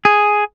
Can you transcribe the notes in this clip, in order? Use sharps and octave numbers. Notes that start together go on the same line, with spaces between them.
G#4